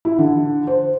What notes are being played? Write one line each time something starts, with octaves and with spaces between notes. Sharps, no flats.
E4
D3
C5